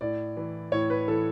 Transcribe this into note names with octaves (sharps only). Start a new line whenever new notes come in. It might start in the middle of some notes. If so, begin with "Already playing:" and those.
A2 D5
E3
A2 C#5
B4
E3 A4